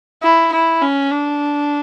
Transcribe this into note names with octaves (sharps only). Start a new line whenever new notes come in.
E4
E4
C#4
D4